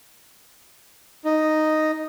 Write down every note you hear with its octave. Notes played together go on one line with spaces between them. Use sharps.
D#4